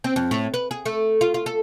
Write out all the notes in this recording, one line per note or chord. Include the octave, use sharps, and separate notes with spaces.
C4
F2
A2
B4
G#4
A3
F4
F4
A4